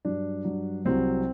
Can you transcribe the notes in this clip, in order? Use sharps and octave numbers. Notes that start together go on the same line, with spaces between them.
G2 F#3 D4
G2 F#3
C2 C3 F#3 C4